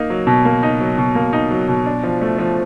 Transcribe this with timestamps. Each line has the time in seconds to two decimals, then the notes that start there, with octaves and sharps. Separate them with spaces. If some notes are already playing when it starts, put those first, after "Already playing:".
Already playing: A#3 D#4
0.10 F#3
0.27 B2
0.45 A#3
0.63 D#4
0.80 F#3
0.98 B2
1.15 A#3
1.33 D#4
1.51 F#3
1.68 B2
1.86 D4
2.03 F3
2.21 A3
2.38 F3